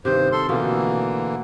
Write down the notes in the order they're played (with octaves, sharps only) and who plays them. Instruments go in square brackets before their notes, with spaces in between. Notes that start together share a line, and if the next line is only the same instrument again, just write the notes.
[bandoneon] G2 C5 [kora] C3 D#3
[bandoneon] A4 C6
[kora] B2 A3 F4 [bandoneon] D3 E3 A#3